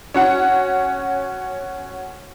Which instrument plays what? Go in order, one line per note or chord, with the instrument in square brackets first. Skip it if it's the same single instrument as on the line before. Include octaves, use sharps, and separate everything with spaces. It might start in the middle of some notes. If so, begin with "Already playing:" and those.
[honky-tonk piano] C#4 F#4 F#5